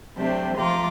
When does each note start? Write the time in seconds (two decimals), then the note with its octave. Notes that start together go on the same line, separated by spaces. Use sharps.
0.17 C3 F#3 A3 C4 D4 G4
0.56 F3 A3 F4 A#5 C6 D6